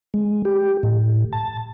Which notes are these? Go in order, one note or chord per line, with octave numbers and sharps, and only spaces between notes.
G#3
G4
A2
A5